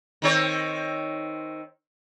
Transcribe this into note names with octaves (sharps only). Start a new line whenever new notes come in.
D#3 C4 C#5